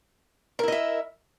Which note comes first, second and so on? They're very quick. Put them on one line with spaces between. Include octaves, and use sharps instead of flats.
A#4 E4 D#5 E5